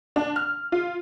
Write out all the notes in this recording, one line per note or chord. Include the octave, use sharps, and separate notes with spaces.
D4
F6
F4